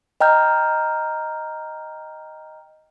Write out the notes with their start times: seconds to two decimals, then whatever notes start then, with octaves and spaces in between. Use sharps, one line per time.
0.20 D#5 G5 A#5 F6 G6